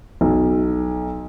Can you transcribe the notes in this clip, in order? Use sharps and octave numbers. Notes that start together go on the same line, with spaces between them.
B1